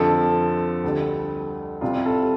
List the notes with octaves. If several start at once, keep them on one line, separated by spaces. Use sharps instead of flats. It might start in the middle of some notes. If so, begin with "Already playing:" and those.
Already playing: F2 D3 F3 A4
D2 D3 G3
C2 C3 G3 F4
A4